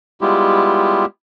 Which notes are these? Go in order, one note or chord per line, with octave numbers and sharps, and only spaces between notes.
G3 G#3 B3 E4 F4 G4